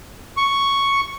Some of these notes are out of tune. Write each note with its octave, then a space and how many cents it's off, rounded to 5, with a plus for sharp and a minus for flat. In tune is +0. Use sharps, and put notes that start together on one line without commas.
C#6 +0